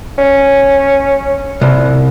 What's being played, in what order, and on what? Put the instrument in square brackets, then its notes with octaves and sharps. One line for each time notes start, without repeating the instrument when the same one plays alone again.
[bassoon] C#4
[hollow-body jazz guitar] C2